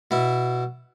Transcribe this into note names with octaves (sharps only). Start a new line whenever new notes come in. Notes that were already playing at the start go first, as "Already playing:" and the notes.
B2 E4